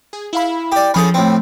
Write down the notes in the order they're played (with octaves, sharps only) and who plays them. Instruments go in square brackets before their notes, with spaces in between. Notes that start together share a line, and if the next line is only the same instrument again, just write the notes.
[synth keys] G#4
E4 F5 B5
[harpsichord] G4 D5
[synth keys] F3 B5 [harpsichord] C#4 G#4 A4
[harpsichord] A2 C4